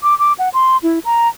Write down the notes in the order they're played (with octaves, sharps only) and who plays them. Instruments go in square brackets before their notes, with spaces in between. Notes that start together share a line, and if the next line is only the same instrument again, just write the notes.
[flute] D6
D6
F#5
C6
E4
A#5